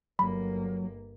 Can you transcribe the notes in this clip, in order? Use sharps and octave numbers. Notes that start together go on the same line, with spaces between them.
G1 F#3 A#3 B5